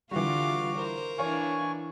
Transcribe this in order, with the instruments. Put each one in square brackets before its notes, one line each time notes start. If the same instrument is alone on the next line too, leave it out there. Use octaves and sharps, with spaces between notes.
[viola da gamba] D3 F4 [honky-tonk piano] E3 G3 [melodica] F#4 [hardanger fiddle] F5 D6
[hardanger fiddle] A#4 [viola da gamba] C5
[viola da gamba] E3 D4 E4 [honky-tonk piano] C#5 F5 [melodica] G#5 C#6